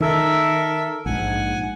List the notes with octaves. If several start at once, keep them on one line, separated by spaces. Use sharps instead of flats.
D#3 A4 A#4 E5
A#1 G#2 F#5 G#5